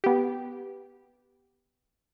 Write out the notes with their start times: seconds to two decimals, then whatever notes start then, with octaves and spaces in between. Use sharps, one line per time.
0.04 B3 G4